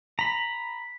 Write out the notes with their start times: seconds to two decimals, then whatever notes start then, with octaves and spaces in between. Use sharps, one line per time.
0.19 A#5 B5 B6